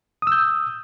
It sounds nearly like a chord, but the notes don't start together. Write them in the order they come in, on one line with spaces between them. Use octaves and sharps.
D#6 E6 G6